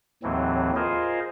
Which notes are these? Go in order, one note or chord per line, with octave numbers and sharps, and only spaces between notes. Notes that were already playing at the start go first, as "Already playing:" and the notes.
D#2 A2 E3 F#3 C4
F4 G#4 A#4 C5 D#5